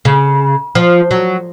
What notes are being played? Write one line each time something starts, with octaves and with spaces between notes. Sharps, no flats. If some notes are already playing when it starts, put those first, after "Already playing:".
C#3
F3
F#3